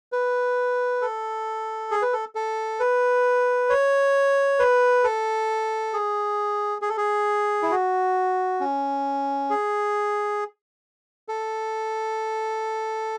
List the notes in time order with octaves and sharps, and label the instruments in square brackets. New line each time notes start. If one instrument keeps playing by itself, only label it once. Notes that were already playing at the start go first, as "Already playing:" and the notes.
[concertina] B4
A4
G#4
B4
A4
A4
B4
C#5
B4
A4
G#4
G#4
A4
G#4
E4
F#4
C#4
G#4
A4